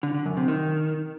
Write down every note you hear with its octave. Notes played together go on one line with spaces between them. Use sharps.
D3
D3
F#2
C3
D#3